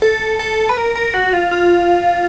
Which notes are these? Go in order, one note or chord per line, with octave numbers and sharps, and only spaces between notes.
A4
A4
B4
A#4
A#4
F#4
F4
F4